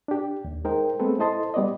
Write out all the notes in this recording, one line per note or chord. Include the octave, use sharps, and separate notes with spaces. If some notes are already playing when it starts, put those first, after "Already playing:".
D4 G4
D#2
G#3 D#4 A#4 C5 G5
G#3 A3 B3 C4 A4 B4
E4 A4 C5 D#5 A5 C6
G3 B3 D5 D#5